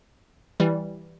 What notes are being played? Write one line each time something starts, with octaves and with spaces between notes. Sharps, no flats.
E3 G3